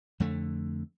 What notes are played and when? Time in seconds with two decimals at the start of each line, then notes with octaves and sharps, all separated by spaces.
0.20 F2 D3 A3